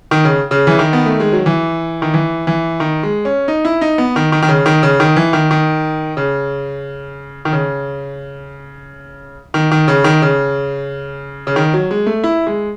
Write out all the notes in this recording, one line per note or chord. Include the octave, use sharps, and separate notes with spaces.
D#3
C#3
C#3
E3
D#3
B3
A3
G#3
F#3
E3
D#3
E3
E3
D#3
G#3
C#4
D#4
E4
D#4
B3
D#3
D#3
D#3
C#3
D#3
C#3
D#3
E3
D#3
D#3
C#3
D#3
C#3
D#3
D#3
C#3
D#3
C#3
C#3
D#3
F#3
G#3
A3
E4
G#3